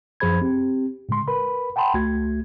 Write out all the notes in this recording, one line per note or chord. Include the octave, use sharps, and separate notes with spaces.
F#2 F3 G#4 C5 B5 G#6
C4 G4
A2 C#3 G#3 C6
A#4 B4 B5
F#5 G5 A5 B5 C6
C#2 A3 F#4 G#6